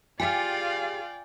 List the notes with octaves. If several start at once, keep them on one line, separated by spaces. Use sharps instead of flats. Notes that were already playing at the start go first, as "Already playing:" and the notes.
F4 G4 G#4 D5 F5 G5 G#5